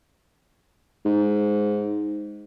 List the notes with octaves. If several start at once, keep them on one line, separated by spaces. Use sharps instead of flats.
G#2